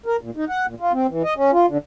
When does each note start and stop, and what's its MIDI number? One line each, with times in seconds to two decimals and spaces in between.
0.06 0.16 70
0.21 0.30 46
0.36 0.45 63
0.49 0.66 78
0.66 0.75 46
0.80 0.92 65
0.93 1.07 60
1.09 1.23 52
1.24 1.34 75
1.36 1.51 61
1.52 1.66 65
1.67 1.78 50